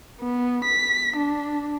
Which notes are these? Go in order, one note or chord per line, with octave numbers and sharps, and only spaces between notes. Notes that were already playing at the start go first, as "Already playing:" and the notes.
B3
B6
D4